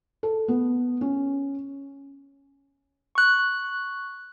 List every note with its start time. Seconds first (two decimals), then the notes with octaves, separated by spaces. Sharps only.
0.23 A4
0.48 B3
1.01 C#4
3.15 C#6 F#6